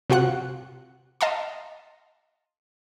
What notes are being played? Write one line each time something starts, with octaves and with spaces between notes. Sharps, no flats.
C3 F4 F#4 F#5 F#6
D#5 F5 A5 A#5 C6